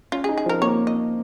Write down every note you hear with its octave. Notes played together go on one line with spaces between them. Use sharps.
C#4 F4
G#4
D#4
G#4
F3
A#4
A#3 C#5
D#5